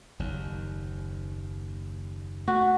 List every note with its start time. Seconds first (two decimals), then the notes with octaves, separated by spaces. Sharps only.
0.19 F#1 D#2
2.48 A3 F#4